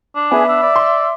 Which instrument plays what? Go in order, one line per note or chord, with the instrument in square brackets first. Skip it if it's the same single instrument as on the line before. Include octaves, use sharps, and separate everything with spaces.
[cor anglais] D4
[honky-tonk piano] B3 [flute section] G#4 G#5 [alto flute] E5
[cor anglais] D4 [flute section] E6
[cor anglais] D5
[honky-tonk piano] C6